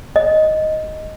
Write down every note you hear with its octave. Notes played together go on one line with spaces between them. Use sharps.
D#5